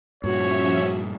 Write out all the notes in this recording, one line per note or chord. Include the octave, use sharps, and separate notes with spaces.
G2 A#2 F3 C#4 F#4 C#5 E5